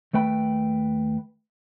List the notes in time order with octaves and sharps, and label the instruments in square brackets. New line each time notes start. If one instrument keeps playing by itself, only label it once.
[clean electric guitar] D#2 A3 B4 G5 B5